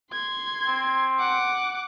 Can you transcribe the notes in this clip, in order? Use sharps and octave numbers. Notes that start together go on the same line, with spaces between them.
C6 G#6
C4
F#5 D6